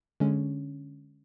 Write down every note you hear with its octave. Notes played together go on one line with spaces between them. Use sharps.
D3 G#3 C#4